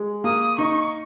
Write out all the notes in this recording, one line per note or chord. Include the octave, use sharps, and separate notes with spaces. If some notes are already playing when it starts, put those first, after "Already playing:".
Already playing: G#3
A#3 D#6
D#4 C#6